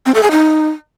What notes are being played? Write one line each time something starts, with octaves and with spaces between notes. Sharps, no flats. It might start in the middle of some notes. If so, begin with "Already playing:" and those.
C4
A4
G#4
D#4